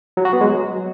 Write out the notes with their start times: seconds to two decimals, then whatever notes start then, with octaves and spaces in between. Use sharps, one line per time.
0.17 F#3
0.25 F#4
0.33 B3
0.41 G#3
0.49 F#3